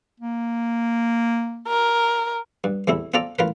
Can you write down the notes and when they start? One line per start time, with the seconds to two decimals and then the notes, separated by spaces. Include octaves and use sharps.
0.20 A#3
1.67 A#4
2.64 G2
2.88 E2 C3 A3 E4
3.14 C4 F4 A4 D5 A#5
3.39 A1 F4 A#4 B4